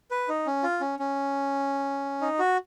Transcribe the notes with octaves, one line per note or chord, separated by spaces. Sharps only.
B4
D#4
C#4
F4
C#4
C#4
D#4
F#4